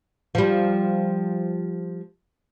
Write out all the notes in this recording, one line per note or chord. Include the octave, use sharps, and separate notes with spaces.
F3 G3